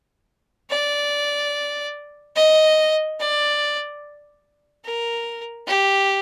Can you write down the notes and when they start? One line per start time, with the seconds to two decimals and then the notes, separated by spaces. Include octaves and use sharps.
0.70 D5
2.36 D#5
3.20 D5
4.85 A#4
5.67 G4